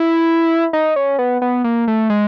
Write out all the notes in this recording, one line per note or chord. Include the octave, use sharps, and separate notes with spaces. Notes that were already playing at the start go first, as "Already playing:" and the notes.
Already playing: E4
D#4
C#4
B3
B3
A#3
A3
G#3